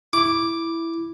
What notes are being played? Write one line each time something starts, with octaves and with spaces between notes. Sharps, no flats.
E4 D6